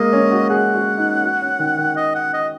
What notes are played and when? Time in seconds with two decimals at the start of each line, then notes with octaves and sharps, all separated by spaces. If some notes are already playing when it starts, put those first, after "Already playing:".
Already playing: G#3 A#3 D#5
0.13 C#4
0.32 F#4
0.50 G#4 F#5
0.74 F#4
0.98 D#4
1.23 F#4
1.42 C#4
1.59 D#3
1.78 D#3
1.97 D#5
2.15 F#5
2.33 D#5